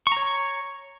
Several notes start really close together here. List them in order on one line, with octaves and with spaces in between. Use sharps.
C#6 A#5 C#5